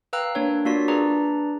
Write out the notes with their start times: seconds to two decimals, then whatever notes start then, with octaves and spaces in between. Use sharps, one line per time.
0.13 B4 F5 G5 A#5 E6 F#6
0.35 A#3 D4 C#5
0.65 A#3 D4 F4 F#4 D5 B6
0.88 D4 G#4 B4 D5 A#5